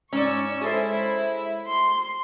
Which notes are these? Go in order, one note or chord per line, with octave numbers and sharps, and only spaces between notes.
G#2 C#4 D5 C#6 E6
G#3 E4 G#4 A4 C5 E5
C6